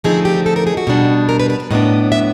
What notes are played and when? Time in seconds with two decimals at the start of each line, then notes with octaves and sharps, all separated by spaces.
0.04 D3 F3 A3 C4 D#4 G#4
0.25 G4
0.46 A4
0.56 A#4
0.67 G#4
0.77 F#4
0.87 B2 G3 B3 D4
1.29 A#4
1.40 B4
1.50 B4
1.60 B4
1.71 A2 F#3 B3 D4 D#5
2.12 E5